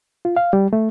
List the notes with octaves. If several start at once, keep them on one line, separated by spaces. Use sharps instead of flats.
F4
F5
G3
A3